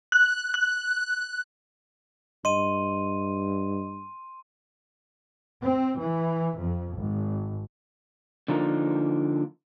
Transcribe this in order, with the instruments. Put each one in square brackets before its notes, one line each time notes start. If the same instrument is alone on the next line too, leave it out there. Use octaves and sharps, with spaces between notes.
[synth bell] F#6
F#6
[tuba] G2 [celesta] D#5 [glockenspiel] C6 D#7
[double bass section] C4
E3
F2
G#1
[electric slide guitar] D3 F3 A#3 D#4 A#4